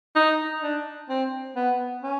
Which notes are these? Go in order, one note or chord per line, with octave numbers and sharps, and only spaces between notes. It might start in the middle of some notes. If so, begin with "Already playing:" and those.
D#4
D4
C4
B3
C#4